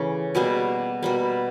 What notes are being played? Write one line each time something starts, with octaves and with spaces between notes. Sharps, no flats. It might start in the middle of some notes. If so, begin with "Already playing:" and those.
Already playing: C#3 E3 A3
B2 G3 A#3 G#4
B2 G3 A#3